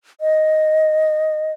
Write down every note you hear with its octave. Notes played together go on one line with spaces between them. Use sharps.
D#5